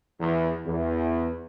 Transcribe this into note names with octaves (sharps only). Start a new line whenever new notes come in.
E2
E2